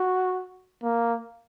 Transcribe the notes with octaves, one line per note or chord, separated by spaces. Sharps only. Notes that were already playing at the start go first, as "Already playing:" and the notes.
Already playing: F#4
A#3